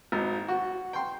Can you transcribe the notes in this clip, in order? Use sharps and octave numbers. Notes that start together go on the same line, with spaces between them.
G#1
F#4
G5 C6